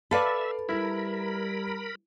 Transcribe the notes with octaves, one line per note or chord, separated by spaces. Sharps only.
A4 B4 D5 E5 F5 B5
G3 E4 A#4 B5